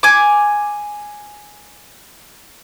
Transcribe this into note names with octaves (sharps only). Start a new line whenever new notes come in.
G#5 D6